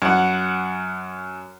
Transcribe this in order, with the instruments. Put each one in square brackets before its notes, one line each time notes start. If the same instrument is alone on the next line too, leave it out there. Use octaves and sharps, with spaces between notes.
[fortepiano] F#2 F#5